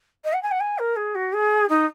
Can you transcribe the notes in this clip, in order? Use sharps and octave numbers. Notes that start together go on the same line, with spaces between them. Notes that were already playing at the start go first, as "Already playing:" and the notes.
D#5
F#5
G#5
F#5
G#5
A#4
G#4
F#4
G#4
D#4